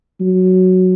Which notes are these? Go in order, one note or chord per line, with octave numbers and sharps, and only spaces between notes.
F#3